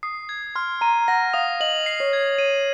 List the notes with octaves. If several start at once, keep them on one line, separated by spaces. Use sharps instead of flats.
D#6 C7
G#6
C6 F6
A#5 D#7
F#5 A#6
F5 D#6
D#5 F#7
C7
C#5
G#6
C#5 D#7